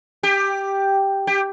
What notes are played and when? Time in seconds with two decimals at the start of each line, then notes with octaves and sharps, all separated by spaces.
0.23 G4
1.27 G4